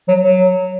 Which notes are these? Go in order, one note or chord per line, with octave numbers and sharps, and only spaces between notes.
F#3
F#3